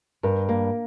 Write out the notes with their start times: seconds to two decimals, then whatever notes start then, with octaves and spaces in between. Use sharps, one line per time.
0.23 G2 A#4
0.49 A#3